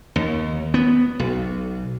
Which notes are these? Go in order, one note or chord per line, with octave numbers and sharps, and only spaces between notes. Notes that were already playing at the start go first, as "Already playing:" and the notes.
D#2
B3
B1